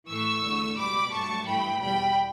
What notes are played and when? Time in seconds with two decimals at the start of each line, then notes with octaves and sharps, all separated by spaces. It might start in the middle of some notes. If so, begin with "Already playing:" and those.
0.09 A2 E3 A3 C#6 E6
0.43 E2 D3 A3
0.77 C#2 B2 G3 B5 D6
1.12 G2 F#3 A3 A5 C#6
1.46 G2 E3 A3 G5 B5
1.81 E2 B2 G3 G5 B5